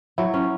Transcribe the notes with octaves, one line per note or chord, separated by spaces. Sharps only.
F#3 E4
C#4